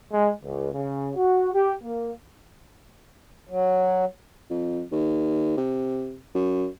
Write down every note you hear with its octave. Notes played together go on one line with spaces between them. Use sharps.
G#3
C#2
C#3
F#4
G4
A#3
F#3
F2
D#2
C3
F#2